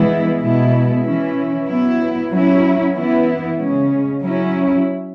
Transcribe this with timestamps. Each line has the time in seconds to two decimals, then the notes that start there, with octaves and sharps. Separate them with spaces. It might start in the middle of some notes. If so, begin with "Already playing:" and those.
Already playing: E3 G#3 B3 E4
0.40 B2 G#3 B3 E4
1.03 E3 C#4 E4
1.67 F#3 B3 E4
2.31 F#3 C#4 E4
2.95 E3 B3 E4
3.58 C#3 G#3 C#4
4.21 F#3 C#4 E4